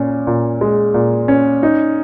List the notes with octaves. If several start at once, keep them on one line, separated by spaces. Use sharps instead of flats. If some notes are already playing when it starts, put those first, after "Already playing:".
Already playing: A#2 C#4
A#2
G#3
A#2
C#4
D#4